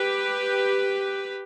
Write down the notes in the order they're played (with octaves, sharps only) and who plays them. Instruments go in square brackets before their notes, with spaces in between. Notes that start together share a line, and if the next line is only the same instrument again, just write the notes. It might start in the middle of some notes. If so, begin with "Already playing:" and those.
Already playing: [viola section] G4 B4